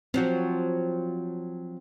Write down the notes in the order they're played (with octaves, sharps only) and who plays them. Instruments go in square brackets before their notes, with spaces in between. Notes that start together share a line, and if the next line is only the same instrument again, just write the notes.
[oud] F3 F#3 F#4 [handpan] C4